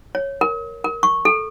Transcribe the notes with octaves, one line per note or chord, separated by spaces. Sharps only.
C#5
A#4
A#4
C#6
A4